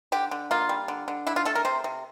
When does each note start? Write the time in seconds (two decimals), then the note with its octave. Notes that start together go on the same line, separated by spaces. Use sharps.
0.12 D3 G4
0.31 D3
0.51 A#3 F4
0.69 G3
0.88 D3
1.08 D3
1.27 D4 E4
1.36 F4
1.45 A3 A4
1.55 A#4
1.65 C3 C5
1.84 C3